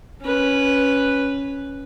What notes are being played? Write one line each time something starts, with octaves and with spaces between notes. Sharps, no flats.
C#4 B4